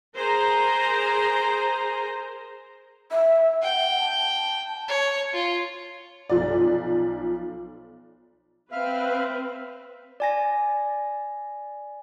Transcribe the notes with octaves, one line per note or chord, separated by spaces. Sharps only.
G#4 A#4 C5 A#5
E5
F#5 G5
A5
C#5
F4
B1 F3 D5
C4 B4 E5 F5 F6
D5 G#5 A#6